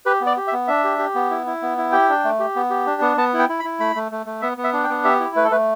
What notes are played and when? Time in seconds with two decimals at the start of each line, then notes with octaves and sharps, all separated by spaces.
0.06 G4 B4
0.21 B3
0.26 D5
0.37 G4
0.47 E5
0.53 B3
0.68 D4 E5
0.84 G4
0.99 G4
1.15 B3
1.30 E4
1.46 E4
1.62 B3
1.78 E4
1.92 G4 G5
2.09 D4
2.24 A3
2.39 G4
2.56 B3
2.70 G4
2.86 D4
3.01 B3
3.17 B3 A5
3.34 E4
3.39 G5
3.49 E4
3.60 B5
3.64 E4
3.80 A3 B5
3.95 A3
4.12 A3
4.26 A3
4.42 B3 E5
4.57 B3
4.64 E5
4.73 D4
4.84 G5
4.89 B3
5.04 G4 E5
5.20 E4
5.36 A3 B4
5.44 A4
5.51 A3 B4